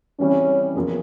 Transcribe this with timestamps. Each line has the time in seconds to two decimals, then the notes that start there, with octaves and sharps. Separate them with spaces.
0.19 C#3 E3 G3 C4 C#4
0.75 E2 C#3 F3 A#3